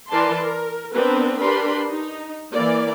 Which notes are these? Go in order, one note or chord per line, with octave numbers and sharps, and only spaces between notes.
E3 A#4 B4 D5 A5 C6
A#4
B3 C4 D4 A#4 B4
D4 G4 A#4 B4 B5 C6
D#4
E3 A#3 D5